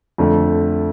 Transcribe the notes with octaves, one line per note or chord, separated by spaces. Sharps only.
F2 D3 A3